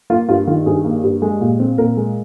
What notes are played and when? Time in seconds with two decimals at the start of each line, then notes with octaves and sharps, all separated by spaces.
0.10 A#3 F4
0.29 G2 F4
0.47 D#3 F4
0.66 G2 G#4
0.85 A#3
1.03 G2
1.22 G#3
1.41 A#2
1.59 C4
1.78 A#2 A#4
1.97 G#3